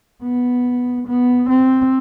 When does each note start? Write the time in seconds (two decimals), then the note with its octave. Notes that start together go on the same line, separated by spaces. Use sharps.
0.23 B3
1.07 B3
1.49 C4